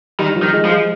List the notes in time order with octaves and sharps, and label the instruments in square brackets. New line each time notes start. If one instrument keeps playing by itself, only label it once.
[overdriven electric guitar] D#3 [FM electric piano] G3
[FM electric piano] F3
[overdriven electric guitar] D#3
[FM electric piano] G#3
[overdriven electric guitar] F3
[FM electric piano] G#3